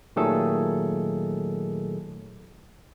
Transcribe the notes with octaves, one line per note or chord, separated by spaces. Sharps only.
A#2 D#3 F#3 A3 G#4 A4